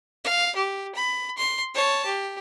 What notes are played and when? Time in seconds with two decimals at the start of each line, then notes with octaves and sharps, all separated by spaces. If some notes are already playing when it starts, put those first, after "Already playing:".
0.24 F5
0.56 G4
0.95 B5
1.38 C6
1.74 C#5 A5
2.06 G4